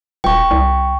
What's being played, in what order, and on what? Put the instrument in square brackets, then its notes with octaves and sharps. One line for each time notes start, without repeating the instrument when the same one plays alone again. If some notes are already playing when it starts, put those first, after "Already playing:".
[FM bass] D#1 [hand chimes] G5 C#6
[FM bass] C2